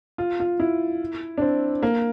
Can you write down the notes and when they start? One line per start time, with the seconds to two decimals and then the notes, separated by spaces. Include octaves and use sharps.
0.18 F4
0.40 F4
0.60 E4
1.37 D4
1.41 C4
1.83 A#3